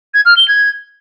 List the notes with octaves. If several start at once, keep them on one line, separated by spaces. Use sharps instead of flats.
G#6
F6
G7
G#6